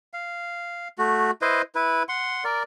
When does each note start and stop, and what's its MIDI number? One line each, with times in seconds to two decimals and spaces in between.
0.14 0.88 77
0.98 1.31 57
0.98 1.31 66
1.42 1.62 64
1.42 1.62 71
1.42 1.62 72
1.42 1.62 75
1.75 2.03 64
1.75 2.03 71
2.09 2.44 78
2.09 2.44 84
2.44 2.63 70
2.44 2.63 74